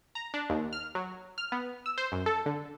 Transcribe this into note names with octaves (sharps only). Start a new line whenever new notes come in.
A#5
D4
D#2
F6
F#3
F6
B3
E6
C5
F#2
A4
D3